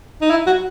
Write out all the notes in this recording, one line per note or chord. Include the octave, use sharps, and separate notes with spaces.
D#4
E4
F#4